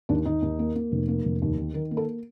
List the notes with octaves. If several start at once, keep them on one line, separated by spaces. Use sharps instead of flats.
D#2 D4
D#2 D#4
D#2
A#3
A#3
F1
A#3
F1
D#2
D#3
D#3 A#4
A#3
A4